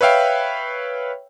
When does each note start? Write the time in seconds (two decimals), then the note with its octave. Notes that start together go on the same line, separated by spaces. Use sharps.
0.01 B4 C#5 E5 F5 G5